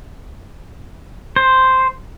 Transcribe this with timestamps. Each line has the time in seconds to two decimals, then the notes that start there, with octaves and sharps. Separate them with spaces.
1.36 C5